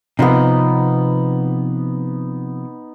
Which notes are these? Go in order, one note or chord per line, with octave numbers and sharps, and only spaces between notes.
C3 F3 B3 D#4